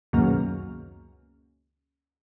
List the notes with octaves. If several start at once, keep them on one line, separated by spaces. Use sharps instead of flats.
C#2 F#2 B2 D#3 F#3 A#3